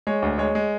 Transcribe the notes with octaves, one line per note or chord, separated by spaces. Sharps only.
G#3 C#5
D2
G#3 C#5
G#3